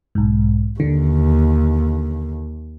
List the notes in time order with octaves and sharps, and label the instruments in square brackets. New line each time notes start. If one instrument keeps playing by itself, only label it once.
[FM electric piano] B1 G#2
[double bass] D#2 [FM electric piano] D3